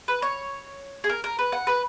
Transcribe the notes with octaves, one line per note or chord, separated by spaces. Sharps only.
B4
C#5
G#4
A#4
A#4
B4
F#5
B4